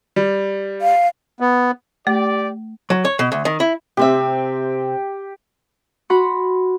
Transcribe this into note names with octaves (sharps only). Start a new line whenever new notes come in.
G3
F5
B3
A3 G4 D5
F#3
C#5
B2
D2
D#3
E4
C3 C4 G4 E5
F#4 F#5 B5 C6